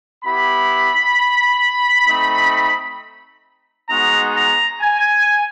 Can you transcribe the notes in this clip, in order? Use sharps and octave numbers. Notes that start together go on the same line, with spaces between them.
B3 E4 G4 B5
A3 C4 D#4
G#3 B3 D#4 F#4 A#5
A#5
G#5